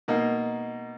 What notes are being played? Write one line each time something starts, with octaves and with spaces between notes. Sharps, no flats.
B2 A#3 D#4